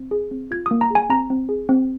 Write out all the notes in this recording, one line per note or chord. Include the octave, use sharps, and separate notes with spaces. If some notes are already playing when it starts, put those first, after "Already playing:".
Already playing: C4
G#4
C4
F4 G#6
A#3 D#6
A#5
G#4 G#5
C4 A#5
C4
G#4
C4